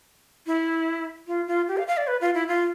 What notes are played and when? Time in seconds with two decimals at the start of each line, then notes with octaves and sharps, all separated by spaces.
0.47 E4
1.27 F4
1.48 F4
1.68 G4
1.77 F5
1.88 F5
1.97 D5
2.07 B4
2.21 F4
2.34 E4
2.48 F4